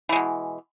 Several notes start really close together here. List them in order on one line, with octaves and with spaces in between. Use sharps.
E3 G#3 B2